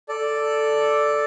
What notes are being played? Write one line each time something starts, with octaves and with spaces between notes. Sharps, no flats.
A4 D5